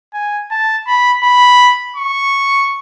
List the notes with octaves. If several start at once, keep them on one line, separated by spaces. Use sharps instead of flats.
G#5
A5
B5
B5
C#6